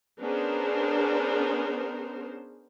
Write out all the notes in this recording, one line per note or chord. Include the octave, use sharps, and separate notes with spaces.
B3 C#4 D4 G#4 A#4 C5